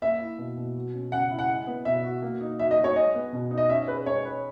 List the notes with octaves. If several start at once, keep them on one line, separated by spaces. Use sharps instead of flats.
A#3 E5
E4
B2
B2
F#3
C#4
C#3 F#5
E4
F#5
G#3
B3
B2 E5
F#4
A#3
D#4
F#3 E5
D#5
F#3
C#5
G#3 D#5
B3
B2
D#4
D#5
C#4 E5
G#4 B4
G#3 C#5
B4